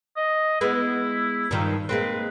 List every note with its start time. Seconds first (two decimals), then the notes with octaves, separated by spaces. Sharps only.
0.17 D#5
0.61 G#3 B3 E4
1.51 G2 D#3 F3
1.89 G#3 A#3 C4 B4